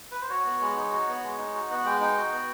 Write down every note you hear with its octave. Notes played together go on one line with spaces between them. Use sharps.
B4
C5
F#4 C#5
B3
G#3
D#4
F#4
B3
G#3
D#4
F#4
B3 F#5
G#3 G5
D#4 G5
F#4
B3